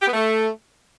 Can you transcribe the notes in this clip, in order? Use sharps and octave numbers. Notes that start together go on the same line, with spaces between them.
G4
B3
A3